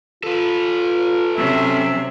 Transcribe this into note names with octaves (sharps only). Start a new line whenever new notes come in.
F4 A4 B4
C3 F#3 C#4 E5